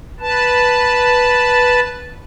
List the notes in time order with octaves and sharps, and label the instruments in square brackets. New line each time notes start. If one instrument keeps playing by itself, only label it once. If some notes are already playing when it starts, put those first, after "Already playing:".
[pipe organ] B4 A5